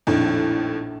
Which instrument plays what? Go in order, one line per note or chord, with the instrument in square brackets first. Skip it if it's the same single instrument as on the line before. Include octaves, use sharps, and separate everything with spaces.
[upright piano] A#1 [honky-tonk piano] F2 A2 D#3